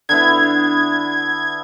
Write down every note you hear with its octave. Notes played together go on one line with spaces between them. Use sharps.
D3 B3 E4 G#6